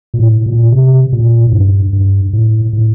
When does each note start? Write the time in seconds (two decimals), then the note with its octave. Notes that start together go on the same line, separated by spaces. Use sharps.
0.14 A#2
0.19 A2
0.46 A#2
0.72 C3
1.13 A#2
1.47 A2
1.53 G2
1.93 G2
2.33 A2
2.73 A2